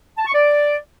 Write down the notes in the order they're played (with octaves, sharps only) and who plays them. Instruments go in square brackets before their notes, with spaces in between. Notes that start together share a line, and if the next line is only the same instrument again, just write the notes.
[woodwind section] A5
C#6
D5